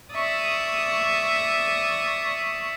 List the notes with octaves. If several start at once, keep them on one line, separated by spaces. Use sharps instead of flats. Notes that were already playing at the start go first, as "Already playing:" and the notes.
D5 E5 C#6 D#6